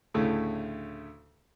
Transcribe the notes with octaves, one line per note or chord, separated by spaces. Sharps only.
D2 A2 C#3 A3